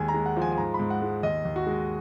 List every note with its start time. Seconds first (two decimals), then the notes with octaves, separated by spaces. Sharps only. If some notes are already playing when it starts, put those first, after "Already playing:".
Already playing: D#2 G#3 G#5
0.08 A#5
0.14 G#3
0.26 F#5
0.37 F3
0.42 G#5
0.52 G#5
0.58 G#2 A#5
0.74 B5
0.79 G#2
0.90 F#5
1.02 G#3
1.23 D#2 D#5
1.45 D#2
1.56 F#4
1.67 G#3